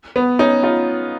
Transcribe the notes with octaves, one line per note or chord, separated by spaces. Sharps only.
B3
C#4 D#4
D#4 F4